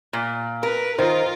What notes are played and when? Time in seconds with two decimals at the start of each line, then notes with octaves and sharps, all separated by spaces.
0.13 A#2
0.63 A#4 B4
0.98 D#3 F4 A#4 C5